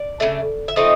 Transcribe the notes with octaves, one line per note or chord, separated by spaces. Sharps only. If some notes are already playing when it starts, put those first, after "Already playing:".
Already playing: D5
C#3 E3 A3 D4
E5
F3 A3 C4 D#4 D#5